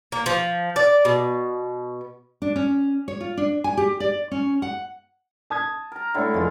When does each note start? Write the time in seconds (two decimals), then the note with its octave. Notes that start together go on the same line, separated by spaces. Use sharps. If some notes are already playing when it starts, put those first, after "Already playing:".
0.12 A#3
0.26 F3
0.76 D5
1.05 B2
2.42 D4
2.56 C#4
3.08 C#5
3.21 F4
3.37 D4
3.64 G#5
3.77 G4
4.00 D5
4.31 C#4
4.62 F#5
5.50 A5 D#6 G#6
5.92 A#4 A#5
6.14 D3 A3 E4 C#5 G5
6.34 F1 G#3 F4 C#5